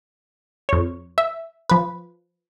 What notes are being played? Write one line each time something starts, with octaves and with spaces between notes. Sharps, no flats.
F2 C#5
E5
F3 B4